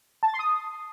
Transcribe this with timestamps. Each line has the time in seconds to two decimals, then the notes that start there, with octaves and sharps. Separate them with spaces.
0.23 A5
0.28 A6
0.34 C6
0.39 D#6